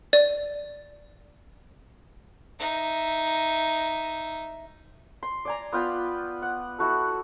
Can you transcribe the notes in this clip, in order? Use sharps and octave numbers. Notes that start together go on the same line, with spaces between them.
D5
D#4 E5
C6
D5 G#5 A#5
B3 F4 G5 B5
F#5
E4 F#4 A4